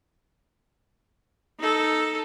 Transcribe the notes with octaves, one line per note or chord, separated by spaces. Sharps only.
D#4 A4